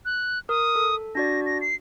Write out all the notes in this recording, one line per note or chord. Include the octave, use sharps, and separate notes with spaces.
F#6
A#4 D#6
A4
D4 F#4 D5 A#6
A#6
C7